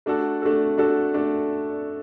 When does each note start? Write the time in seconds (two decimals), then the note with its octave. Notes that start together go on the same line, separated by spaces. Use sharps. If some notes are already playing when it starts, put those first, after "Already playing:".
0.06 A3 D4 F#4 A4
0.42 A3 D4 F#4 A4
0.78 A3 D4 F#4 A4
1.14 A3 D4